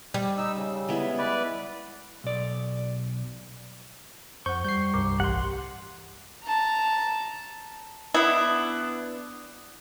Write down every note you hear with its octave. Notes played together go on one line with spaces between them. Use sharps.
G3
D#4 E6
C#3
G#3 B3 E4
B4 D5
B1 D5
F2 C5 F#5 C#6 G6
G3 G6 C7
C2 G2 A#4 D6
A1 G4 F#5 C6
A5 A#5
B3 D4 E4